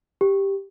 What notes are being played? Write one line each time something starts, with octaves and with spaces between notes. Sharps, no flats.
G4